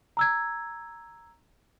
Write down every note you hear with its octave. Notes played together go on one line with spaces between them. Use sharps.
A#5 E6 G#6